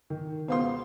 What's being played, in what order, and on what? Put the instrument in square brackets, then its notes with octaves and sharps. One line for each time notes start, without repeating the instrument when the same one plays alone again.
[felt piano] D#3
[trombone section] C#2 B2 B3 [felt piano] C5 F5 C6